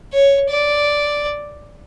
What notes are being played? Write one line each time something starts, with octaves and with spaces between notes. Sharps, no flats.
C#5
D5